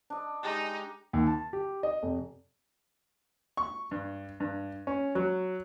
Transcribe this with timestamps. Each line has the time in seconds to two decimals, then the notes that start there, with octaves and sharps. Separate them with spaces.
0.10 D4 D#5
0.43 G#3 D#4 G4
1.13 D#2
1.27 A5
1.53 G4
1.83 D#5
2.03 F1
3.57 C#6
3.91 G2
4.40 G2
4.87 C#4
5.15 F#3